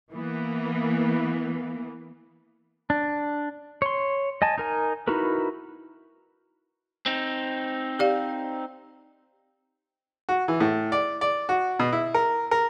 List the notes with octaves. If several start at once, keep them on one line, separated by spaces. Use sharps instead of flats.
E3 A#3 B3
D4
C#5 C6
D#5 G#5 A5
D#4 A#4 G#5
D#4 E4 F#4 A#4 B4
C4 D#4
G4 D5 F5
F#4
E3
A2
D5
D5
F#4
B2
E4
A#4
A#4